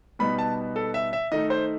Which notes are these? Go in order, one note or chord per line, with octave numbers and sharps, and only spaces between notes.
B2 G3 B3 D#4 B5
A5
A4
E5
E5
D#3 A3 D#4 D#5
C5